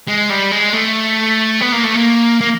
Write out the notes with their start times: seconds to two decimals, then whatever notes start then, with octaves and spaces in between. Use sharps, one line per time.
0.08 G#3
0.30 G3
0.51 G#3
0.73 A3
1.61 B3
1.72 A#3
1.84 A3
1.95 A#3
2.41 A#3